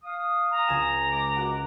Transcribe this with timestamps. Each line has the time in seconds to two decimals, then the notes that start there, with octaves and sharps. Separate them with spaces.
0.03 F5 D#6
0.51 A#5
0.67 C#2 G#5 E7
1.09 G#3 D6
1.36 F#4 A#4 F#5